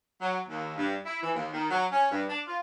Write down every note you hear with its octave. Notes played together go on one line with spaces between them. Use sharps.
F#3
D#2
G2
E4
E3
D#2
D#3
F#3
C#4
G2
D4
F4